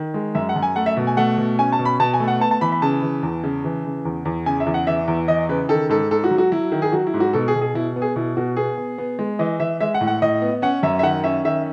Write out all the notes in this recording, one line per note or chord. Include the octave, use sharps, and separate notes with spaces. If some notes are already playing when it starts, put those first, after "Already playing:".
Already playing: D#3
G#3
F#2 E5
F#5
F#2
G#5
A3 F#5
E5
B2
G#5
A3 F#5
B2
C#4 G#5
A5
B2
B5
B2 A5
G#5
A3
F#5
B3 A5
A5
E3 B5
B5
C#3 A5
E3
E2
C#3
E3
C#3
E2
E2
C#3 G#5
E5
E2
F#5
E3 E5
E2
E3 D#5
C#3 B4
D#3 A4
G#2 A4
G#2 A4
F#4
F#3
F#4
F#3 E4
D#3
G#4
F#3 F#4
E4
G#2
F#4
B2 A4
G#4
B2
G#4
B2 E4
B3
G#4
B2 E4
B2 F#4
B3 G#4
B3
B3
G#3
E3 D#5
E3 E5
G#3 E5
F#5
A2
F#5
A2 D#5
B3
C#4 F#5
F#2 E5
E5
D#3 F#5
C#4 E5
D#3 E5